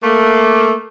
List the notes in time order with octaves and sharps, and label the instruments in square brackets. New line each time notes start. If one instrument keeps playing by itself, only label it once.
[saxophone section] A3 A#3